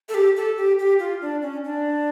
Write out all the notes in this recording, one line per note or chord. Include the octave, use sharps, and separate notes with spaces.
A4
G4
A4
G4
G4
F4
D4
C#4
D4